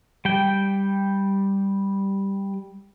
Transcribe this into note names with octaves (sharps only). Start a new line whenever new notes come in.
G3 G5